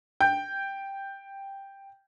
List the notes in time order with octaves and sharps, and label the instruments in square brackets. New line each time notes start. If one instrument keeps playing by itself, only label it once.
[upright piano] G5 G6